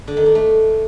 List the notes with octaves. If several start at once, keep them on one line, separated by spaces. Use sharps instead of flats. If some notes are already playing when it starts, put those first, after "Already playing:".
D3
D#3
D4
A3